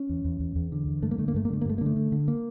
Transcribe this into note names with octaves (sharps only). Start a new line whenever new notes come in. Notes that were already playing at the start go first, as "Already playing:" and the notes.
Already playing: C#4
E2
E2
E2
E2
D3
E2
G2 A3
A#3
D3 A3
A#3
G2 A3
A#3
D3 A3
A#3
G2 A3
A#3
D3 A3
D3
D3
A#3